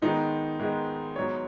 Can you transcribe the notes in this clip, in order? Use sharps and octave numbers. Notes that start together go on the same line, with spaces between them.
G#2 D#3 G#3 B3 D#4
G#2 D#3 G#3 B3
G#2 F#3 B3 C#5